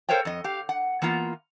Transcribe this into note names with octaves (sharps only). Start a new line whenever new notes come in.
A4 A#4 C5 C#5 F5 G5
F2 D#5
G4 F5
F#5
E3 A#3 B3 F4